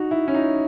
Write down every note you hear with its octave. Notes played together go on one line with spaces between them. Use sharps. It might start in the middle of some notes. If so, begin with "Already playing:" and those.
Already playing: D#4 F#4
E4
C#4
D#4